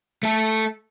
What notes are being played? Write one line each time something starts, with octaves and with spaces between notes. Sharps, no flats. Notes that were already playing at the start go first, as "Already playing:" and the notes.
A3 A4